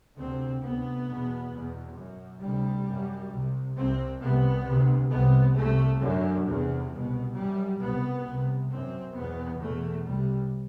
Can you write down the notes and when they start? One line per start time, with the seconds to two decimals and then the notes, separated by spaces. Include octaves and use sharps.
0.17 D2 C3 C4
0.62 D2 C3 B3
1.07 E2 B2
1.52 E2 B2
1.98 F#2
2.42 D2 C3 G3
2.87 F#2
3.32 C2 C3
3.76 C2 C3 C4
4.21 C2 C3 B3
4.66 D2 C3
5.11 C2 C3 B3
5.56 C2 C3 A3
6.01 F#2 D3
6.46 E2 C3
6.91 C2 B2
7.36 F#2 G3
7.80 C2 B2 B3
8.25 C2 C3
8.70 F#2 C4
9.15 E2 B2 B3
9.60 E2 B2 A3
10.05 C2 C3 G3